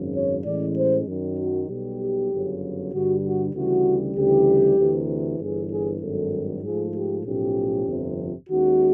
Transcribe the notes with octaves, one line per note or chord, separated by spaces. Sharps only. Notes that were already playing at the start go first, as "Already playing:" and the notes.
Already playing: G#1 F#2 C#3
C#5
A2 E3 G#3 C#4 D5
C5
F#2 D#3 F#3
F#4
B1 B2 G3 B3 G4
G1 F#2 C#3 F#3
G2 D3 G3 F#4
F#4
D2 C#3 E3 G3 F#4
D2 C#3 E3 G3 G4
D2 C3 E3
G1 G2 E3 G#4
G#4
G#1 G2 D#3 F#3 A4
G#2 F3 A3 G#4
G4
B1 A2 F3 A3 C#4 G4
G1 F2 C3 F3
D#2 D#3 G#3 C#4 F#4